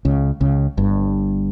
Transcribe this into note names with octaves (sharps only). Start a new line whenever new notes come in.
C#2 C#3
C#2 C#3
G1 G2